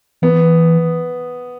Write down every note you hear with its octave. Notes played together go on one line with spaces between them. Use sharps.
E3 B3